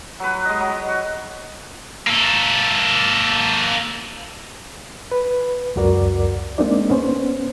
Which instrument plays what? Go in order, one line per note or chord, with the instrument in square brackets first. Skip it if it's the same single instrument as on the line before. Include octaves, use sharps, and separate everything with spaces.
[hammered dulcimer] F#3 B4
G#3 D#5
F#3
F#4
[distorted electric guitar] A#3 A4
[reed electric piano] B4
C#2 F#2 F#4 A#4 D5
G#3 A#3 C4 D4 D#4 D5
B3 C#4 C5